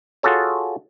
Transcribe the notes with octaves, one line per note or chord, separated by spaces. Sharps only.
F4 F#4 G#4 A4 C#5